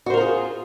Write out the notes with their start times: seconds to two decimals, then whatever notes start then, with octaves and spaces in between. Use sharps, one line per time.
0.06 F#4
0.10 C5
0.14 A#4
0.17 F4
0.21 G#4